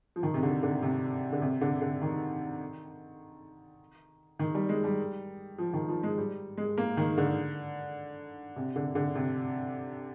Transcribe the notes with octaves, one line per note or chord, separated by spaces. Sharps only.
F3
D#3
C3
D3
D3
C3
D3
C3
D3
D3
D#3
D#3
G3
G#3
G3
F3
D#3
F3
G#3
G3
G#3
A#3
D#3
D3
C3
D3
D3
C3